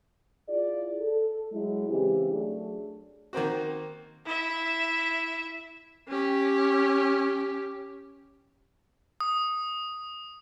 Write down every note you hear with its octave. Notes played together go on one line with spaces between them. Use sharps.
E4 F4 G#4 D5
A4
F#3 G#3 E4
C#3 E3 C4 G4
F#3 A3 D4 G#4
D#3 A#3 C4 F#4
E4 E5
C#4 G4
D#6